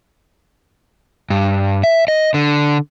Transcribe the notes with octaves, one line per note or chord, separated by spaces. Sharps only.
G2
E5
D#5
D3